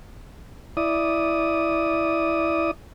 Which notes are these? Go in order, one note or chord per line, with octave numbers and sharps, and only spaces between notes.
E4 D5 D#6